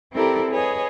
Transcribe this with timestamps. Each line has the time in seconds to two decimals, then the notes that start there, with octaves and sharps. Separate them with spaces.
0.12 C4 E4 G4 A4 A#4 D5
0.50 G#4 B4 C#5 D#5